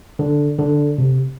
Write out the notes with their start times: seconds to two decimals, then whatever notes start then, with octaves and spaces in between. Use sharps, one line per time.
0.19 D3
0.59 D3
0.98 C3